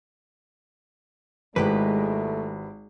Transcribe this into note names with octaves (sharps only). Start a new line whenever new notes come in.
G#1 G#3 A3 E4 G4 B4